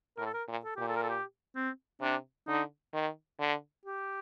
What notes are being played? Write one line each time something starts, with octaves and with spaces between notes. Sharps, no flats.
A2 A#4
A4
A#4
A#2
A4
A#2 G4
A4
A#4
A4
G4
C4
C3 D4
D3 D#4
D#3
D3
G4